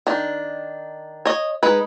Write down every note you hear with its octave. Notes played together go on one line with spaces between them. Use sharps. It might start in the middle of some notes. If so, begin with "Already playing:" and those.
D#3 D4
C#5 D#5
G#3 D#4 B4